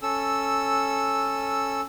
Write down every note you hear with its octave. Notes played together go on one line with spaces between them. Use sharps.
C#4 A4 E6